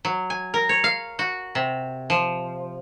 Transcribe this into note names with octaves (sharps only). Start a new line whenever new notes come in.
F#3
G#5
A#4
C#5
F5
F#4
C3
F3